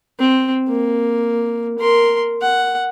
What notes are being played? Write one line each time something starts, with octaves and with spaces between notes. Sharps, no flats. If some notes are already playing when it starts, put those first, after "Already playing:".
C4
A#3
A#4 C6
F#5